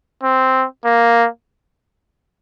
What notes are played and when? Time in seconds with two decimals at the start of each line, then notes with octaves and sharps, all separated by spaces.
0.23 C4
0.85 A#3